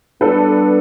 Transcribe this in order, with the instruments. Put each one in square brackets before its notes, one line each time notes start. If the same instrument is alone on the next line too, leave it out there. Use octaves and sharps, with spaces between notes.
[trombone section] G3 B3 D4 [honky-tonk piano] A4 B4